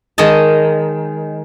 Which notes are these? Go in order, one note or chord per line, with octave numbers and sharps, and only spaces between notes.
D#3 G#3 C#5 D#5 A5